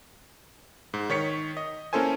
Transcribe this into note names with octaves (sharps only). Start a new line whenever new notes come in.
G#2
D#3 C#5 B6 C#7
D#5
A#3 C#4 E4 A4 C5 G#5